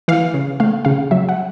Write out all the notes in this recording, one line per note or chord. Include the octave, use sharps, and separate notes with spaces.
E3 F5
C#3
A3 F5
C#3 F5
F#3 E5
F#5